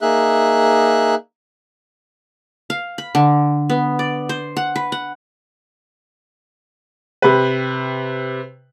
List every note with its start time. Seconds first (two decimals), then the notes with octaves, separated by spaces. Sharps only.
0.02 A#3 D#4 G#4 E5 F#6
2.70 F5
2.98 B5
3.15 D3
3.70 B3
3.99 D5
4.29 C5
4.57 F#5
4.76 B4
4.92 F#5
7.22 C3 B4